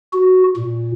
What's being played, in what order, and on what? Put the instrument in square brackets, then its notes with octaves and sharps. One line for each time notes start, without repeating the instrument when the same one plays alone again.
[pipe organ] F#4
A#2